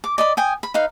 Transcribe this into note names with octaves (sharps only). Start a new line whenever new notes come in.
D6
D5 D#5 B5
G5 G#5 D#6
B5
D#4 B4 F5